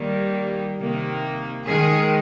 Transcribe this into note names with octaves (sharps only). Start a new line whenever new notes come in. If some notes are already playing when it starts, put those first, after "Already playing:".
Already playing: D#3 G3 A#3
C3 D#3 A#3
D#3 G#3 G#4